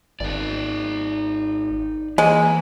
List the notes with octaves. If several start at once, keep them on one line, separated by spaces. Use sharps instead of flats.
G#1 D#4 D5
E3 G#3 A#3